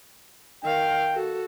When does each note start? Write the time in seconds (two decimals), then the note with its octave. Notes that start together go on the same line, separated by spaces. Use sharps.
0.64 D#3 F5 G5
1.14 F#4 A4